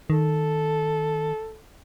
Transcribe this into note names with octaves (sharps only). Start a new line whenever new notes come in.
D#3 A4